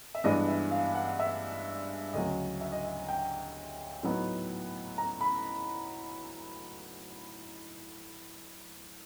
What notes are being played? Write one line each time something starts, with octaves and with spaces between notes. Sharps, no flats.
E5
G2 E3 G#3 B3 D4 D#5
E5
F5
F#5
E5
D2 C#3 F#3 D#5
E5
D#5
E5
G5
A2 F#3 B3 D#4
A#5
B5